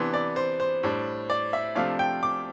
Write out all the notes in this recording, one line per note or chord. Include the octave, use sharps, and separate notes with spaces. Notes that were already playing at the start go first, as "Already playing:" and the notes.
Already playing: C3 E3 B3 D4 C6
D5
C5
C5
A2 G3 D4
D5
E5
C3 F3 A3 D4 F5
G5
D6